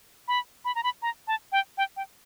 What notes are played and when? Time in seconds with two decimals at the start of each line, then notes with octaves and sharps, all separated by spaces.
0.28 B5
0.65 B5
0.75 A#5
0.83 B5
1.02 A#5
1.28 A5
1.52 G5
1.78 G5
1.97 G5